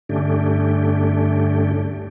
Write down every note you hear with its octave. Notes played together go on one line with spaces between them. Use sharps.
G2 D3 A3 C#4 D4 G4